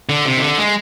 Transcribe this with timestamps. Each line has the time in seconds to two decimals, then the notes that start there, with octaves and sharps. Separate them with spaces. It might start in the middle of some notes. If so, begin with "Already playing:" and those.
0.09 D3
0.25 C3
0.37 D#3
0.42 D3
0.58 G#3